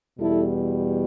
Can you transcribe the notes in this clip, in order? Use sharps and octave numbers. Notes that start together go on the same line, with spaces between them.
E2 B2 G3 E4 A4